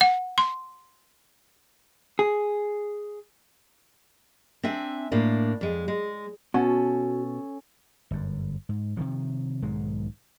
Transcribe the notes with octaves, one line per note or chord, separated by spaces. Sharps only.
F#5
C6
G#4
C4 D4 E5 G#5
A2 A#3 D4
F2 G#3
G#3
B2 C#4 F#4 A4
G1 F#2
G#2
C3 D#3 F3
B1 G#2 D#3 G#3